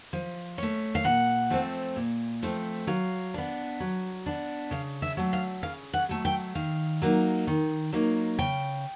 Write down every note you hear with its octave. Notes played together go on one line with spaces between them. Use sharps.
F3
A3 C#4
F5
A#2 F#5
F3 A3 C4
A#2
F3 A3 C4
F#3 F5
B3 D4
F#3
B3 D4
C#3 F5
E5
F#3 A3
F5
C#3 F5
F#5
F#3 A3
G5
D#3 F5
F#3 A#3 D#4
D#3
F#3 A#3 D#4
C#3 G5